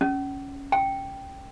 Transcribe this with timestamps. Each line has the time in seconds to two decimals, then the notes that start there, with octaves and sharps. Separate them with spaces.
0.01 C#4
0.72 G5